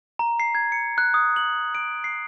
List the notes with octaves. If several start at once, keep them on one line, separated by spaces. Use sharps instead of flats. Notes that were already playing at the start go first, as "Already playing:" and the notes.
A#5
C7
G#6
C#7
F#6
D#6
F#7
D7
C7